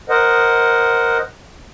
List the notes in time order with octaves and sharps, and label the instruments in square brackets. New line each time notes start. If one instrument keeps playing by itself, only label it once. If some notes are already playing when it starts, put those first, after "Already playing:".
[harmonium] A#4 C5 D#5 F#5